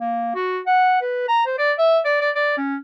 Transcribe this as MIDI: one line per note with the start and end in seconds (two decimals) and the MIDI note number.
0.01 0.34 58
0.35 0.60 66
0.67 0.99 78
1.01 1.28 71
1.28 1.43 82
1.46 1.57 72
1.58 1.72 74
1.78 1.99 76
2.05 2.18 74
2.21 2.30 74
2.35 2.53 74
2.58 2.76 61